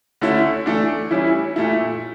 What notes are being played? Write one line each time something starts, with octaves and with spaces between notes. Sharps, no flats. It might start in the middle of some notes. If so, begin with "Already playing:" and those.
D3 A3 C#4 E4
E3 A3 D4
E3 G3 C#4 E4
A#2 A3 E4